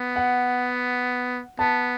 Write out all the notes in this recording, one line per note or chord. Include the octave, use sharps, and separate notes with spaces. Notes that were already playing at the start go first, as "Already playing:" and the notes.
Already playing: B3
F#5
B3 A5